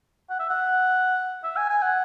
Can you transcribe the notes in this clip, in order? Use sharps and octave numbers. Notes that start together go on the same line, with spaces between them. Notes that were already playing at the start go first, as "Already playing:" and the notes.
F#5
E5
F#5
E5
G#5
G#5
F#5